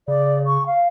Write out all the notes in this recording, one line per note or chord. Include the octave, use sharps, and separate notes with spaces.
C#3 D5
C#6
F5